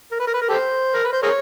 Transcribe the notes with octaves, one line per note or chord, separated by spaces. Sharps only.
A#4
B4
A#4
B4
A#4
G4 A4 C5
A#4
B4
C5
G#4 A#4 C#5